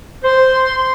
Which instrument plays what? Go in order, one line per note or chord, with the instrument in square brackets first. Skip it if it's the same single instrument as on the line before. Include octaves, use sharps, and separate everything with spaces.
[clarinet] C5 [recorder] C6